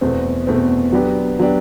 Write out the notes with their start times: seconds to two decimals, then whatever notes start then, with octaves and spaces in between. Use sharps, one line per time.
0.01 E2 B2 A3 C4
0.47 E2 B2 A3 C4
0.92 F#3 B3 D4 G4
1.39 F#3 B3 D4 G4